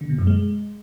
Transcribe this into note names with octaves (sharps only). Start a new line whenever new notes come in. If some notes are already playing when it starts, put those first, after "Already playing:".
D3
B2
F#2
G#3